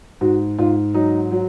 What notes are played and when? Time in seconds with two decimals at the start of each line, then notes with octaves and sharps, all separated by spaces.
0.21 G#2 F#4
0.59 G#2 F4
0.94 F#3 D#4
1.32 F#3